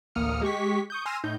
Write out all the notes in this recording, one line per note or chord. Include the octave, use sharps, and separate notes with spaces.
A1 D2 A#3 D#6 F6 C#7
G#3 G4 C#6 B6
C#6 D#6 G6
G#5 C6 E6 F6 A#6 D#7
A2 D#4 G6